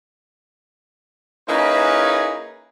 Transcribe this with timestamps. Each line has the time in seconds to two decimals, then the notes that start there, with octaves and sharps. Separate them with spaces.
1.49 A#3 C#4 D#4 E4 G#4 B4